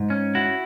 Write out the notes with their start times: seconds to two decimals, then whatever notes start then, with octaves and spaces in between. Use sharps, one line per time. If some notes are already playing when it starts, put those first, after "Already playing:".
Already playing: G#2
0.10 C#4
0.35 E4 F#4